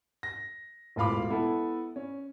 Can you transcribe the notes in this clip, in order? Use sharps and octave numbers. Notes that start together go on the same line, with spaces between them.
A#6
E1 A2 F4 F5 B5 D6
B3 E4 A4
C#4